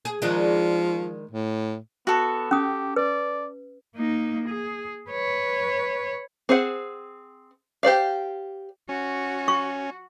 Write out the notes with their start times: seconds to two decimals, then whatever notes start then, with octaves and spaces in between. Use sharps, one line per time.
0.05 G#4
0.22 D#3 F3 G#3 D4
1.31 A2
2.07 B3 F#4 A4
2.51 C#4 G4 D#6
2.96 B4 D5
3.96 A#3 D#4
4.49 G#4
5.10 B4 C#5
6.49 C4 G#4 C5 F#5
7.83 G4 C5 D5 F5
8.89 C#4 F#4
9.48 C#6